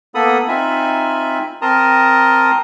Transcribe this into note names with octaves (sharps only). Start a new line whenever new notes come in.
A#3 B3 A4 B5 D#6
C4 D#4 F4 E5 G#5 B5
C4 A#4 A5 A#5 C6 D#6